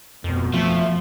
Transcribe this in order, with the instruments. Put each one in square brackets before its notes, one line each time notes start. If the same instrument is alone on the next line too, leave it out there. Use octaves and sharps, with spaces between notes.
[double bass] F1 B2 [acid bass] F2
[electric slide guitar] F2 [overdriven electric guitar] F3 [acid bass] A3